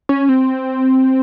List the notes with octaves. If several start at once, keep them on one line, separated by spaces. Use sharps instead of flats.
C#4
C4